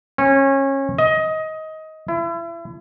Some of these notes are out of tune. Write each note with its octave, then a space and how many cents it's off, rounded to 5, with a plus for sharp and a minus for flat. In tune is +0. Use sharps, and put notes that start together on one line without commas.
C#4 -25
D#5 +20
E4 +35